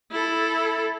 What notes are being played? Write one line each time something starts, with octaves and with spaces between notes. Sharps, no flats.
E4 A4